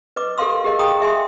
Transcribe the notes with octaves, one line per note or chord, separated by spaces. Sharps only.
B4 D#5 D6
G4 A4 A#4 F5 C6 E6
G4 G#4 A#4 D#5 F5
G#4 G5 A#5 D#6
G#4 E5 G#5 C6